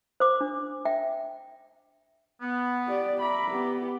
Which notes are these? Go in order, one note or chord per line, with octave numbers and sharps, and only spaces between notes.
C5 D6
D4
E5 G5
B3
G4 D5
E5 A#5 B5 D6
B3 G4